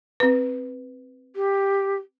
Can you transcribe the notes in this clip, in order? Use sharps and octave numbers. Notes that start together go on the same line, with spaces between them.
C4 B4
G4